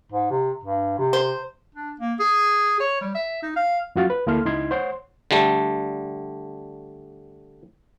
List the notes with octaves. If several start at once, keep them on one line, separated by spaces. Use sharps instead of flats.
G#2
C3
G2
C3
C5
D4
A#3
G#4
C#5
G3
E5
D#4
F5
F#2 F4 F#4 F5 A6
B4
D2 A#3 E4 A4 C6 F6
C#2 D#4 E4 C6 G#6
C5 C#5 F#5 C6
D3 G3 A3